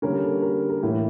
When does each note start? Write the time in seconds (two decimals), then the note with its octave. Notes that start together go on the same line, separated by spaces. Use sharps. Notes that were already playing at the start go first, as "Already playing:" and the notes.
0.02 D3 G3 A#3 C#4 A#4
0.22 A4
0.42 A#4
0.70 A#4
0.82 A2 E3 A#3